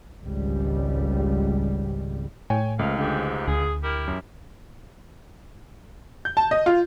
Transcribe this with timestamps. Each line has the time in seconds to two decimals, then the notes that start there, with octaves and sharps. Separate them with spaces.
0.22 G#1 C#2 G3
2.50 A2 C#5 G5 G#5
2.79 C#2 F3 A3 F5
2.97 G#2 D3 G4
3.48 D2 G#4
3.83 E4 G4 A#4
4.08 F#2
6.25 G6
6.37 A5
6.51 D#5
6.66 F4